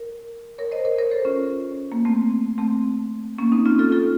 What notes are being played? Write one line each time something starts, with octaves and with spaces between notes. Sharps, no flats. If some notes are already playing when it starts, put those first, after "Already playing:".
Already playing: A#4
A#4 C#5
C5 D#5
A#4 C#5
A#4 C#5
A4 C5
C#4 F4
A#3
A3 C4
A3 C4
A#3 C#4
C4 D#4
C#4 F4
F4 A4
F4 A4